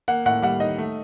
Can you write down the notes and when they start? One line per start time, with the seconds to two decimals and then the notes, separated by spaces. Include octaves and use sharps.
0.08 A#3 F#5
0.26 A2 F#5
0.42 G3 F#5
0.60 D#4 D#5
0.78 A3